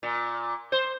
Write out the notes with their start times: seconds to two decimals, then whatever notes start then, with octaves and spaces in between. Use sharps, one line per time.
0.03 A#2
0.72 C5